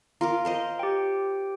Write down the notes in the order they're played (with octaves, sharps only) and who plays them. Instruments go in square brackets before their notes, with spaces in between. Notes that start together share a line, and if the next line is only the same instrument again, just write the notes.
[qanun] F4 A#4 D6 [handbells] A#5
[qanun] A#4 C5 D#5
[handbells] G4 G5